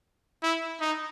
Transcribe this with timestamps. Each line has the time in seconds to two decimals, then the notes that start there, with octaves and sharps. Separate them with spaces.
0.43 E4
0.81 D#4